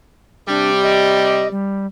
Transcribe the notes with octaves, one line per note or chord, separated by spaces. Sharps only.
C3 G3 D4
D#5
G3